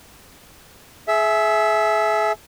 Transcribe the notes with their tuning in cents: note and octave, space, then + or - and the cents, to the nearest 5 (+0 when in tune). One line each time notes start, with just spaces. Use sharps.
G#4 +35 E5 +0